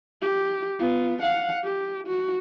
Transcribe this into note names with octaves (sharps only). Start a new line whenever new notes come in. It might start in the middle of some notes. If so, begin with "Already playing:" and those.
G4
B3 F4
F5 F#5
G4
F#4